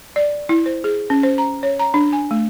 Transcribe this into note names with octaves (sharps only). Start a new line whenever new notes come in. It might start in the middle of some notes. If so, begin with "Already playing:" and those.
D5
E4
C5
G#4
C#4
C5
A#5
C#5
A#5
D4
G#5
A3